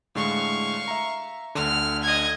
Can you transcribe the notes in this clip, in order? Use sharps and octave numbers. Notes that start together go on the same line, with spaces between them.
A2 D3 G#3 F5 C#6
E5 A#5
D2 D3 F6
D#5 G#6